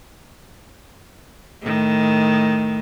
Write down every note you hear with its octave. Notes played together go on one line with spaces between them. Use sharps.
A2 D#3